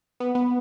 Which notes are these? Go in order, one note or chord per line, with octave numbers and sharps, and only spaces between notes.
B3
B3